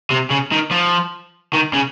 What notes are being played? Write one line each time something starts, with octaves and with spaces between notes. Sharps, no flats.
C3
C#3
D#3
F3
D#3
C#3